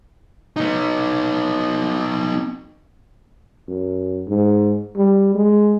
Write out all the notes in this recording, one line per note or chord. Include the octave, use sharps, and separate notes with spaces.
B3 D#4
F#2
G#2
G3
G#3